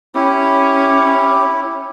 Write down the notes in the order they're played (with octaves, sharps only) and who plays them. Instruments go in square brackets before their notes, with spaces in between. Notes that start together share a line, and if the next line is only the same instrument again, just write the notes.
[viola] C#4 [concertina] E4 [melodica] G4